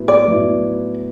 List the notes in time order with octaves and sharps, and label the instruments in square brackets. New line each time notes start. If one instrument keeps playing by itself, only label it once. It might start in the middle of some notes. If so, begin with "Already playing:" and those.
Already playing: [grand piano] A2 F#3 B3 E4
[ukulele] D5
[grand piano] A2 F#3 B3 E4